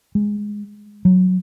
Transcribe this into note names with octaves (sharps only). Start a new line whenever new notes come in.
G#3
F#3